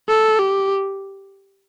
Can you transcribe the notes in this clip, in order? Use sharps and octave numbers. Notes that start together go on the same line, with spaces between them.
A4
G4